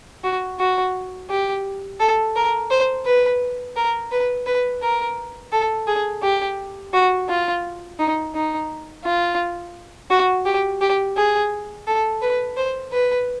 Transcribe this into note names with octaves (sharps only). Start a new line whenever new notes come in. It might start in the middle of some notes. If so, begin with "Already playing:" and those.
F#4
F#4
G4
A4
A#4
C5
B4
A#4
B4
B4
A#4
A4
G#4
G4
F#4
F4
D#4
D#4
F4
F#4
G4
G4
G#4
A4
B4
C5
B4